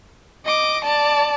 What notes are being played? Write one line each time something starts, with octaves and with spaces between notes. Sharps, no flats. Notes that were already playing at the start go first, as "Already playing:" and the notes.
D#5 D6
D5 A5